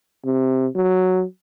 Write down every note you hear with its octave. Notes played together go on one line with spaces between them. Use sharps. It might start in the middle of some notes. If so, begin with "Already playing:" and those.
C3
F#3